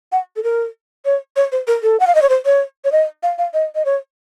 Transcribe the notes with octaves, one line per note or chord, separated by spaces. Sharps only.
F#5
A4
A#4
C#5
C#5
C5
A#4
A4
F#5
F5
D#5
C#5
C5
C#5
C#5
D#5
F5
F5
D#5
D#5
C#5